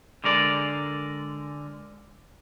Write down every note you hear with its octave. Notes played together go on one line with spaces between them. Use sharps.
D3 G#3 A#4 D5